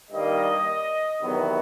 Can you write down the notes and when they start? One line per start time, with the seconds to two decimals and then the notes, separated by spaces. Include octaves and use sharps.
0.11 G2 D#3 G3 A#3 D#5
1.22 E2 C3 D#3 F#3 B3